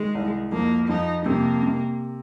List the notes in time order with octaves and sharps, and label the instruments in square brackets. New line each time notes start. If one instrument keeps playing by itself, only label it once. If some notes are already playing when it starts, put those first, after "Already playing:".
Already playing: [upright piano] D#3 [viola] G#3
[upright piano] C2
[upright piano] F2 [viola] A#3
[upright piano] F2 [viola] D#4
[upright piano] C3 [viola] A#3
[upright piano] C3